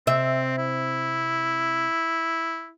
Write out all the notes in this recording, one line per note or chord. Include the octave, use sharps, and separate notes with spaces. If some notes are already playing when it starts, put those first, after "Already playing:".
C3 C4 E5
E4